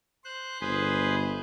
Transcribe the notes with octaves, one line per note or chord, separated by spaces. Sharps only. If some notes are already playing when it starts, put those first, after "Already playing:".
C5 F#6
G1 G#4 B4 C5